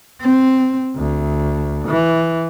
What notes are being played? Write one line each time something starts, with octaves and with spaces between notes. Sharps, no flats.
C4
D2
E3